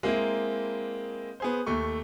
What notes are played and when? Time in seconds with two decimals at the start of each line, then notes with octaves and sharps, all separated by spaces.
0.03 G#3 A#3 C4 E4
1.40 B3 G#4 C5
1.66 D#2 A3 C#6